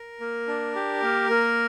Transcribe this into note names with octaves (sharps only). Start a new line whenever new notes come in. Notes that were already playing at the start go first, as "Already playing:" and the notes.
Already playing: A#4
A#3
D4
G4
A#3
A#3